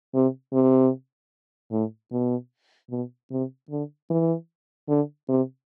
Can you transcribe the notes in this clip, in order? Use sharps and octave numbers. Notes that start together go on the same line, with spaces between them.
C3
C3
A2
B2
B2
C3
D3
E3
D3
C3